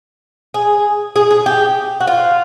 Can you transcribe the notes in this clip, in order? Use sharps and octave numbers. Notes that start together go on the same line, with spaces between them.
G#4
G#4
G#4
G4
F#4
F4